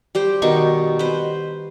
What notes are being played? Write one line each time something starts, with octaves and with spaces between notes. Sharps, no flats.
G3 G4 C5
B2 D#3 D#4 C#6
B4 C5